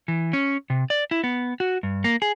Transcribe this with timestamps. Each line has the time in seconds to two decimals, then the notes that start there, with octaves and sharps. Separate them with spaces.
0.08 E3
0.33 C#4
0.70 C3
0.90 D5
1.11 E4
1.24 B3
1.60 F#4
1.83 G2
2.04 A#3
2.22 G#4